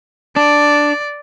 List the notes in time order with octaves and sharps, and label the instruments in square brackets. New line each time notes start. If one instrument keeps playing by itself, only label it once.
[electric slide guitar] D4 [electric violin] D5